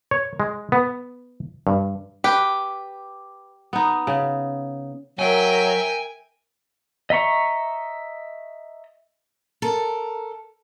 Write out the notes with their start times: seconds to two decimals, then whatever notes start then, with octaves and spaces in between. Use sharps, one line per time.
0.11 C#5
0.40 G#3
0.72 B3
1.67 G2
2.24 G4 B4
3.73 B3 D#4
4.07 C#3
5.19 F#3 A#4 E5 G5 G#5
7.10 D#5 E5 A#5 C#6
9.62 A4 A#4